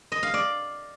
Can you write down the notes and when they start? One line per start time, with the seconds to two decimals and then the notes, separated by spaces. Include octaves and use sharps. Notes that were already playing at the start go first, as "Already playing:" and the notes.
0.12 D#5
0.23 F5
0.34 D5